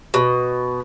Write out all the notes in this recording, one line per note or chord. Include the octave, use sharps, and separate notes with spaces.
B2